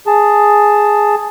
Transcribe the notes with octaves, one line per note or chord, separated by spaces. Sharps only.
G#4 A5